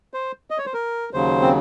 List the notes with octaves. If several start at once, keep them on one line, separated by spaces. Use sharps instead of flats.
C5
D#5
C#5
C5
A#4
D#2 C#3 F#3 C5
C4